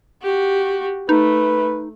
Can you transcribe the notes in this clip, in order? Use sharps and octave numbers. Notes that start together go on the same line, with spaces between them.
F#4 G4
A3 D#4 B4